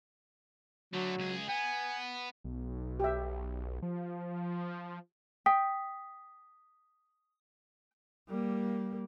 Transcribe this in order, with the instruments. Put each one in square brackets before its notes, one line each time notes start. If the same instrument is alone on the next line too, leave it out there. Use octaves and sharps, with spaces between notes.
[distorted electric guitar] D3 A3 [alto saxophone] F#3
[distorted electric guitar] C#2 G#4
[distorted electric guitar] B3 [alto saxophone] G#5
[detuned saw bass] B1
[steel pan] G4 E5
[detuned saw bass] F3
[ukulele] G5 [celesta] D#6 B6
[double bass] G3 A#3